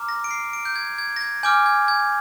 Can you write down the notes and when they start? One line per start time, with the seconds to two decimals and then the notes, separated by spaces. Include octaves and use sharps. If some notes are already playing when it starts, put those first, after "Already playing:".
Already playing: A#5 D6 F6
0.09 A#6
0.24 D7
0.31 C7
0.53 D7
0.65 G6
0.76 G#6
0.98 G#6
1.16 A#6
1.21 G#6
1.43 G#5 D6 F6 G6
1.66 G#6
1.88 G#6